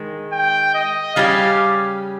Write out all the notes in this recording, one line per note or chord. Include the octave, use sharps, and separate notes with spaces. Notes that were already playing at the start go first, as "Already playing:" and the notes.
Already playing: D#3 G#3
G5
D#5
C#3 G3 C#4 G4 F5